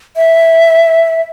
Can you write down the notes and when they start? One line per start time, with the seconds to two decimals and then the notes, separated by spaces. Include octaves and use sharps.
0.17 E5